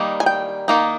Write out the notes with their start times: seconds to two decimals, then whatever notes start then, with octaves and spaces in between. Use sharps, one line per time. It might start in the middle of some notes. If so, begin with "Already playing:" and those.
Already playing: D#3 G3 A#3 D#4
0.20 G#5
0.26 G5
0.68 D#3 A#3 D#4